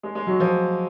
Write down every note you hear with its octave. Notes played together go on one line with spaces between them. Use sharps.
G#3
G#3
F#3
F3